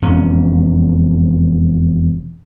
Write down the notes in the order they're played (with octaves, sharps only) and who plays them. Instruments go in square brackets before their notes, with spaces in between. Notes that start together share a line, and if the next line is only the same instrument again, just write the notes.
[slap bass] E1 F2 C#4